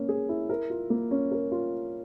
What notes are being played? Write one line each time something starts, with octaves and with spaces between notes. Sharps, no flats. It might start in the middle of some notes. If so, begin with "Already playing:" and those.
Already playing: A#3 C#4
G#4
E4
A#4
F4
A#3
C#4
A#4
F4